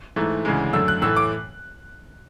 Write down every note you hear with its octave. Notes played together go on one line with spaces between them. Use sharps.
G#2 E3 A3
D2 C#3 E3 G#3
F#2 D3 A3 E6
F#6
A2 E3 A3 E6
D6